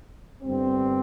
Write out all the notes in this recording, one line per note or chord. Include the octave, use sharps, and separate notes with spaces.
G1 G2 G3 C4